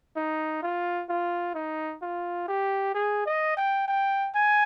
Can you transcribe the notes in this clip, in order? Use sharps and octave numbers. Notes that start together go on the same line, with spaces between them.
D#4
F4
F4
D#4
F4
G4
G#4
D#5
G5
G5
G#5